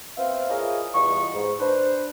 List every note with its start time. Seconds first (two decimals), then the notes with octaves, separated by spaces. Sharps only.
0.17 B3 C4 C5 E5 F5
0.49 E4 F4 G#4 A#4 C#5 D#5
0.95 E2 G3 B3 F4 D#5 C#6
1.34 G#2
1.59 D4 B4 C5